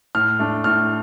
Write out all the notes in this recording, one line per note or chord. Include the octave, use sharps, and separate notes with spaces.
A2 F6
A3 D4
A2 F6